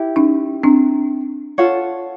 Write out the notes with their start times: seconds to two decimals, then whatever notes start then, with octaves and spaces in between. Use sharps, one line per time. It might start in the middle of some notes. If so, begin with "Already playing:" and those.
Already playing: E4 G4
0.16 C#4 D#4
0.63 C4 D4
1.58 F4 A4 C#5 F#5